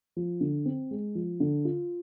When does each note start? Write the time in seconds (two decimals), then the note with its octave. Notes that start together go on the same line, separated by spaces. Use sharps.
0.16 F3
0.41 D3
0.66 C4
0.91 G#3
1.15 F3
1.40 D3
1.65 F4